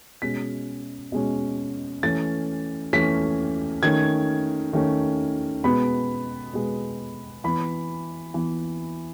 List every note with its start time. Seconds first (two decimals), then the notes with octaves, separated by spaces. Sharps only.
0.22 B2 G#3 C#4 B6
1.12 B2 G#3 C#4
2.03 E3 A3 C#4 A6
2.93 E3 A3 C#4 B6
3.83 D#3 A3 C#4 G#6
4.73 D#3 A3 C#4
5.64 B2 G#3 B3 B5
6.53 B2 G#3 B3
7.44 E3 B3 B5
8.34 E3 B3